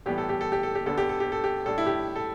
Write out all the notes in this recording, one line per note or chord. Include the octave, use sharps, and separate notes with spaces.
A2 E3 G3 B3 G4
A4
G4
A4
G4
A4
G4
D2 D3 B3 D4 A4
G4
A4
G4
A4
G4
A2 G3 D4 A4
E4
G4
A4